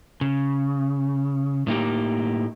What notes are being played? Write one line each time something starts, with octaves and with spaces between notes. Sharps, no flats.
C#3
A2 A#3 D#4 G4